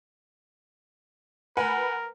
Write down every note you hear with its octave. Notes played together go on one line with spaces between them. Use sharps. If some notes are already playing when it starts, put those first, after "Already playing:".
A#4 B4 F#5 G#5